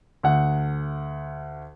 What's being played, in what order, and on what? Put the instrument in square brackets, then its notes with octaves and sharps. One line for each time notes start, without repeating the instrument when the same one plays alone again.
[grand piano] D2 F#5